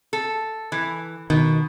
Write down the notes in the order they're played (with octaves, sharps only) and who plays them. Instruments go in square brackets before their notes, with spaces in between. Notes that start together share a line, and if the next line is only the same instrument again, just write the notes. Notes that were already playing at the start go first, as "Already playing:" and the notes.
[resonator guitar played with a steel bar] A4
E3
[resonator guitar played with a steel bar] B2 [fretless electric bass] D#3